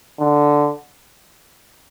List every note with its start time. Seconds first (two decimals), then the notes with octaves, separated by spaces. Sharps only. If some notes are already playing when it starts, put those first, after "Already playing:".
0.20 D3